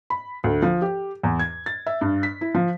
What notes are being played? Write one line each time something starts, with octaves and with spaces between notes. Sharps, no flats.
B5
D2
F3
G4
E2
G#6
A6
E5
G2
B6
E4
F3